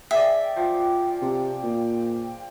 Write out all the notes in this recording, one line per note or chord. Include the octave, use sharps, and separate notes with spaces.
G#4 D5 E5 G5
F3
C3
A#2